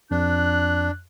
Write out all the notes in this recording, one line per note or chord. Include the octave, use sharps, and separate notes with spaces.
F2 D4 F#6